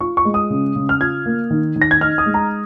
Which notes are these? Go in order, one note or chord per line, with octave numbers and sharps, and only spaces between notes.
F4 C#6
C#6
G#3
D#6
C#3
C#3
F6
F4 G#6
A#3
D#3
D#3
A#6
G#6
D#4 F6
D#6
G#3
A#5